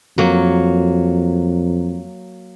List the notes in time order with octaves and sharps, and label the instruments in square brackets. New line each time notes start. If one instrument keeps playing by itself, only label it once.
[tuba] F2 [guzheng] F#3 A#3